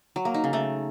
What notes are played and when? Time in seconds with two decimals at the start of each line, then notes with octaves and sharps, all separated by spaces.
0.16 F#3
0.25 A#3
0.34 D#4
0.44 C#3
0.53 A3